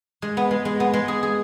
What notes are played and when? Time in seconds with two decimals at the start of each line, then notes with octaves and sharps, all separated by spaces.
0.22 G#3
0.37 B3
0.51 G#3
0.65 G#3
0.80 B3
0.94 G#3
1.08 G#4
1.23 G#4